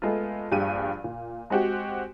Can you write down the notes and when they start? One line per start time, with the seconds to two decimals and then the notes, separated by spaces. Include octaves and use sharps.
0.02 G#3 A3 B3 F4
0.51 A#1 G2 G4 G#4 D#7
1.04 A#2
1.50 G#3 C4 F#4 G4